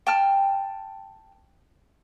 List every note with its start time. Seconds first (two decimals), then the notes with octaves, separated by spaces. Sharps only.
0.07 G5 A5 F6